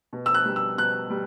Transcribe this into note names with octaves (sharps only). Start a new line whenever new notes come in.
B2
E6
F#6
G3
E6
B2 F#6
G3